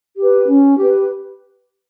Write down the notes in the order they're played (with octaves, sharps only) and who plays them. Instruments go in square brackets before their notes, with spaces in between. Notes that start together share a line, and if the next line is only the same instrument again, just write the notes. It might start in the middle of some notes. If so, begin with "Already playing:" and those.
[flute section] G4 B4
C#4
G4 B4